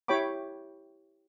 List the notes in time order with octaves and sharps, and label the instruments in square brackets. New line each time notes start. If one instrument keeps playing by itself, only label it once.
[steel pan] E4 G4 C#5 G5 B5 D6